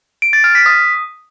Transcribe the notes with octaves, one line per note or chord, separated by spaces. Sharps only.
D7
A6
F6
B6
D#6